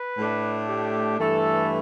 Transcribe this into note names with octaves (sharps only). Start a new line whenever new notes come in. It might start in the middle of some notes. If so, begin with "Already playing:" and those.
Already playing: B4
A2 A3 D4
G4
G2 E3 A3 E4 A4